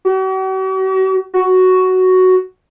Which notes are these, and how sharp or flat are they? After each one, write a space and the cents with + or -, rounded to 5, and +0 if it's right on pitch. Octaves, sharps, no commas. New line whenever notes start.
F#4 +45
F#4 +5